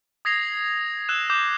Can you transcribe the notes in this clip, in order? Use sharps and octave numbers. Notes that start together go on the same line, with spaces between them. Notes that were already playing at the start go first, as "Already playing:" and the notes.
D#6 G#6 A#6 C7 F7
E6 F#6 E7
D6 G6 E7